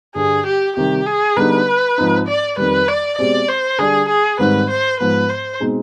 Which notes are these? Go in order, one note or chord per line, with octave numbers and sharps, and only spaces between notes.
G2 D3 G3 G#4
G4
C3 D#3 G3 G4
G#4
D3 G3 B3 D#4 G#4 B4
G#2 F3 C4 D#4
D5
F2 D#3 G3 B4
D5
B2 G#3 C4 G4 D5
C5
D3 G3 D4 G4 G#4
G#4
G#2 D#3 G3 C4 B4
C5
G#2 F3 B3 B4
C5
B2 G#3 C4 D#4